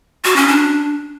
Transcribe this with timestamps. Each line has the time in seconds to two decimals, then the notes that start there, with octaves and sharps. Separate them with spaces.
0.25 F#4
0.36 C#4
0.48 D4